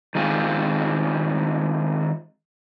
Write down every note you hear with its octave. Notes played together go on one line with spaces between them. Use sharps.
D#3 G#3 C4 F4